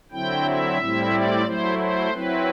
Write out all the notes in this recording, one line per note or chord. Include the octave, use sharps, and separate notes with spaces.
D3 F#3 C4 E4 G5
E5
A2 G3 C4 E4
D5
F#3 A3 E4 C5
C5
F#3 C4 E4 B4